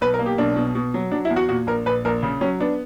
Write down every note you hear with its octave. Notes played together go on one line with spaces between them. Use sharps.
B1 B4
A#4
A#3
G4
B1 D4
B2
B2
F#3
F#3 D4
E4
E2
F#4
A#2 F#4
A#1 A#4
A#1 B4
A#1 A#4
C#3
F#3 C#4
B3 D4